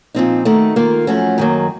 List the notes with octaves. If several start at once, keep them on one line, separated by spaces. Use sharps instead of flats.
A#2 F3 C4 D#4
D#3 A3 D#4 F#4
D#3 A#3 F4
F#2 F3 A3 C#4 F#4
F#2 D#3 F#3 A#3